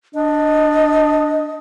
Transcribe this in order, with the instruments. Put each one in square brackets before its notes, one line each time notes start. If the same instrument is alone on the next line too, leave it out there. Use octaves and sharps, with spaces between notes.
[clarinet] D4 [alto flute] D#5